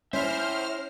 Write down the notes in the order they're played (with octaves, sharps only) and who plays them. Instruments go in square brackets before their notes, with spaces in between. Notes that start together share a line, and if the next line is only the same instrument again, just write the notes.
[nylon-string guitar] C#4 E4 [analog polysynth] C5 F6 [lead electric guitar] C#5 E5